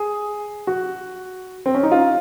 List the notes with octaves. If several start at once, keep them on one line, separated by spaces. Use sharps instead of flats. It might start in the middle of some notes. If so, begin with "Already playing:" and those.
Already playing: G#4
F#4
C4
C#4
D#4
F4